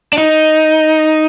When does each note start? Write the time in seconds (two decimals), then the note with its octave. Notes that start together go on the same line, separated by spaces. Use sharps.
0.13 D4
0.18 D#4